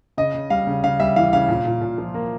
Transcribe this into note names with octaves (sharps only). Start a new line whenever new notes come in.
C#3 D#5
C#3
G3 F5
C#3
C#3 F5
G3 E5
E3 F5
C#3 F5
A#2
A#2
A#2
F3
A#3